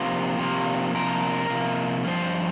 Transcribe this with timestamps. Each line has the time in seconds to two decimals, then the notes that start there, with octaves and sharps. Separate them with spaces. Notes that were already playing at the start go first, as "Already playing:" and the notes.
Already playing: C3 F3 A#3
0.37 C3 F3 A#3
0.94 C3 F3 A#3 A#4
1.50 C3 F3 A#3
2.06 G2 F3 C5